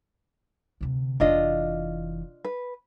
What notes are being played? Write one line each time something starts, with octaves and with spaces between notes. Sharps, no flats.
D2 C3
F1 E3 D4 F4 D#5
B4